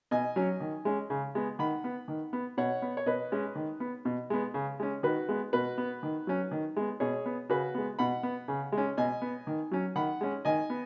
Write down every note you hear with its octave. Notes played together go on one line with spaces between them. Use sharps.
B2 D#5 G#5
F#3 C#4
D#3
G#3 C#4
C#3
G#3 B3
D#3 F#5 B5
B3
D#3
B3
B2 C#5 F#5
B3
C#5
B2 B4 D#5
G#3 C#4
D#3
B3
B2
G#3 B3
C#3
G#3 C#4
D#3 F#4 B4
G#3 B3
B2 F#4 B4
B3
D#3
F#3 C#4
D#3
G#3 B3
B2 G#4 C#5
B3
C#3 F#4 B4
G#3 B3
B2 F#5 B5
B3
C#3
G#3
C#4
B2 D#5 G#5
B3
D#3
F#3 C#4
D#3 F#5 B5
G#3 C#4
D#3 D#5 G#5
B3